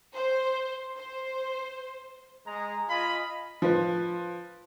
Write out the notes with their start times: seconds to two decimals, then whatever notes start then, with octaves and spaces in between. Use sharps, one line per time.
0.15 C5
0.96 C5
2.46 G#3 A#5
2.90 F4 D#5 F5 G#5 B5
3.62 F3 B4